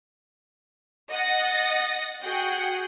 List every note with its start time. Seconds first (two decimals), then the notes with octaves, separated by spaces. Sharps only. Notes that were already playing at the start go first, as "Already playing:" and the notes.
1.10 D#5 F#5 A6 A#6
2.22 F#4 G#4 F#5 G5